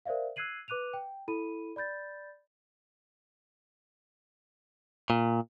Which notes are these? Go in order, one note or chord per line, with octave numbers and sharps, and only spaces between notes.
A#4 C5 D5 E5 F5
E6 F#6 G#6 C7 D#7 F#7
B4 D6 F#6 D#7 F7
G5
E4 A4 B5 D#7
D5 B5 G6 A6
A#2